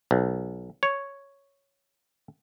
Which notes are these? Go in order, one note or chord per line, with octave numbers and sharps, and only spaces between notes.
B1
C#5